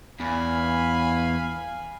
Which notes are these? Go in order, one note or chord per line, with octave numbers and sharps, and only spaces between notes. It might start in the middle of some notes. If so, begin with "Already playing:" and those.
E2 F5 G#5 B5